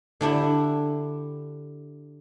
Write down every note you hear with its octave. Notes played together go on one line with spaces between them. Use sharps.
D3 D4 E4 G4